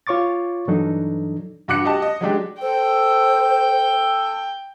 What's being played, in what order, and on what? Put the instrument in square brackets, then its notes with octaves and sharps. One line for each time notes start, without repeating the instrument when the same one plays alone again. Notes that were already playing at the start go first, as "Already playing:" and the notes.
[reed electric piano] F4 C#5 C#6 D6 A6
G2 E3 F#3 D4 D#4 A4
[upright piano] G2 F#4 D6 F#6 C#7
G4 D#5 A5
D#5
F#3 G#3 D4 G4
[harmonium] A4 [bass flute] C5 [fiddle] G5